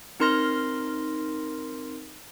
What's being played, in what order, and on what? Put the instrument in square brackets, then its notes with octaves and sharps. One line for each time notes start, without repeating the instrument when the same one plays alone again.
[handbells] C4 D#4 A#4 C6 F6 A#6